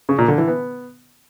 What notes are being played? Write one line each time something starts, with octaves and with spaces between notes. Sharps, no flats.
C#3
A#2
D3
E3
B3